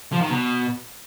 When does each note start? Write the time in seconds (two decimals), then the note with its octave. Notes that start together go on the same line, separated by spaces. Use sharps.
0.13 F3
0.21 D#3
0.30 B2